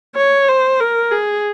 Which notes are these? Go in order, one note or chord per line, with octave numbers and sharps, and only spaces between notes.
C#5
C5
A#4
G#4